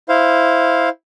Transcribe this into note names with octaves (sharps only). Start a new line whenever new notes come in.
E4 C5 F5